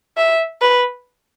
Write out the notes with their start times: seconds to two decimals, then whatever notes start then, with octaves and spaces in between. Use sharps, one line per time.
0.17 E5
0.62 B4